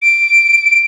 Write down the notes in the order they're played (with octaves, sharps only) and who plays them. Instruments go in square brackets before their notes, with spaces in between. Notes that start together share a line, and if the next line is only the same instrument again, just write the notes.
[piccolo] D7